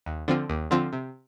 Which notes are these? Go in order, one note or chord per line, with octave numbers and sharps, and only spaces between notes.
D#2
D3 F3 C4 F4
D#2
D3 F3 C4 F4
C3